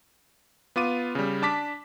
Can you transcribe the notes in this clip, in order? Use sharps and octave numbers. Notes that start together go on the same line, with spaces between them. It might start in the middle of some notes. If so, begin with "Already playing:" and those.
B3 F4 D6 D#7
C#3 G3
D4 A5 D6 B6